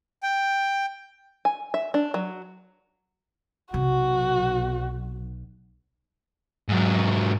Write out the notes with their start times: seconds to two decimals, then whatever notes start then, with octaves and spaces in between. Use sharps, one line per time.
0.23 G5
1.45 G#5
1.74 E5
1.94 D4
2.14 F#3
3.74 B1 C3 F#4
6.69 G#2 F#3